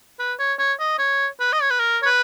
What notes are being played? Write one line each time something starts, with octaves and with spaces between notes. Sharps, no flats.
B4
C#5
C#5
D#5
C#5
B4
D#5
C#5
B4
A#4
C#5
B4